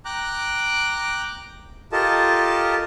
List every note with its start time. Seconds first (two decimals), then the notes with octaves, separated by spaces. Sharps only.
0.05 G5 A#5 D6 F#6
1.92 F4 G4 A4 A#4 D#5 A5